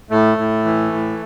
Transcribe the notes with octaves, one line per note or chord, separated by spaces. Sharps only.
A2 A3
A2
E3
A2